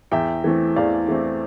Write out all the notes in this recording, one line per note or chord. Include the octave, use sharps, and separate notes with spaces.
E2 E5 G5
E3 A3 C4
E2 D5 F5
E3 A3 C4